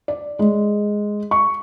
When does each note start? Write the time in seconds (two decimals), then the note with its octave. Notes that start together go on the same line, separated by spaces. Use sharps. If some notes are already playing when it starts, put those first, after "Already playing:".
0.08 D5
0.39 G#3
1.31 C#6